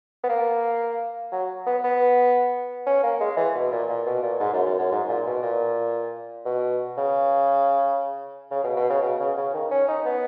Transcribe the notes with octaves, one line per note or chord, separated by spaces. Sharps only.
B3
A#3
F#3
B3
B3
C#4
A#3
G#3
E3
B2
A#2
A#2
B2
A#2
G#2
F#2
F#2
F#2
G#2
A#2
B2
A#2
B2
C#3
C#3
B2
B2
C#3
B2
C#3
C#3
D#3
C#4
D#4
B3